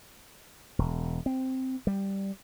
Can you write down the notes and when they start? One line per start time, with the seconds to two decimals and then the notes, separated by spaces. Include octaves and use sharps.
0.79 E1
1.26 C4
1.87 G3